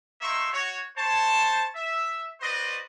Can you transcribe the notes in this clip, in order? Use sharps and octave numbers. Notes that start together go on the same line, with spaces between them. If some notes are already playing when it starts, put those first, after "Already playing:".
A3 A#3 D#4 E5 C6 C#6
F#4 C#5
C5 C#5 A5
E5
F#4 B4 C5 D5 D#5